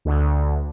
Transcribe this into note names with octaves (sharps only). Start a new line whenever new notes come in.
D2